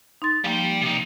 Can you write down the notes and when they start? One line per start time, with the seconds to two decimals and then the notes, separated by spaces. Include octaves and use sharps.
0.22 D#4 C6 A6
0.44 F3 G3 A#3 G5
0.81 C3 D#4